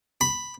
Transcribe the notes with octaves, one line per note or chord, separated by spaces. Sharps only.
B5